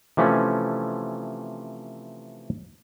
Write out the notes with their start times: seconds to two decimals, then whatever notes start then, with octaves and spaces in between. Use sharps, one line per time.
0.17 C3 E3 F3 A3 C#4